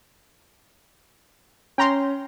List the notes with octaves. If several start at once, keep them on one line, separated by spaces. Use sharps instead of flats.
C#4 G5 A#5 C6